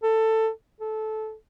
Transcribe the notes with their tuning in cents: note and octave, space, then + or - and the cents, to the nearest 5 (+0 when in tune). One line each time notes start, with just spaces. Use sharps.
A4 +15
A4 -15